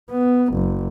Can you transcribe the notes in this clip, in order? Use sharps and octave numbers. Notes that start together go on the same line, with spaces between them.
B3
F#1